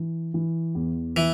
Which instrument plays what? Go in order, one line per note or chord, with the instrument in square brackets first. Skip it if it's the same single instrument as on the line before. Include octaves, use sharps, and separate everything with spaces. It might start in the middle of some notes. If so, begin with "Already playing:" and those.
Already playing: [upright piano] E3
E3
E2
[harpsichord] E3